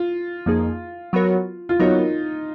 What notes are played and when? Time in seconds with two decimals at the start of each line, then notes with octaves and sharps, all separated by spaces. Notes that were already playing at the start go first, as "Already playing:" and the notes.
Already playing: F4
0.46 F2 F3 A#3 D#4 G#4
1.13 F#3 B3 F#4 A#4 C#5
1.69 F4
1.79 F#3 B3 D#4 F#4 A#4 C#5